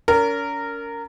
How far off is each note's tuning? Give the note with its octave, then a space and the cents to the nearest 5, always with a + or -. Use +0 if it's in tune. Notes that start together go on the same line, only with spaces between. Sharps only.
C#4 +40 A#4 -15